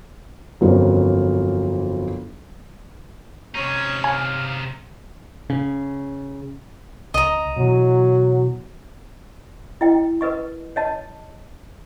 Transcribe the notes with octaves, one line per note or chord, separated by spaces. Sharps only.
G1 F2 F#3 C4 C#4 A#4
C3 C#4 D#4 C#5
F5 G#5
C#3
C#2 D#5 A#5
B2 E3 F#3
E4 D#5 G5
A#4 B4 D#5 C#6
C#5 D#5 A5